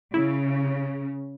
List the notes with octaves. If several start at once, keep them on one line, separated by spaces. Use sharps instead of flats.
C#3 E4